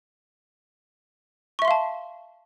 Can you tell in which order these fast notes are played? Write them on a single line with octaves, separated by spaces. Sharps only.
C#6 E5 C6 F5 A5